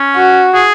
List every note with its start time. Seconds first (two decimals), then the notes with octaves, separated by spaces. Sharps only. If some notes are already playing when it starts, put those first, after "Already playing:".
Already playing: C#4
0.16 F#4
0.54 G#4